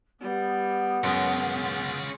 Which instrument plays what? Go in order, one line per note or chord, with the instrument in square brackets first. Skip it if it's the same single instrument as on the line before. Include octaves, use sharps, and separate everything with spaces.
[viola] G3 [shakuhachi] B3
[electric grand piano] F#2 [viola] G#3 [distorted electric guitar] C#4 F4